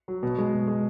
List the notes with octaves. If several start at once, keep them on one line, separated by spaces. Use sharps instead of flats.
F#3
B2
G#3
B2
G#3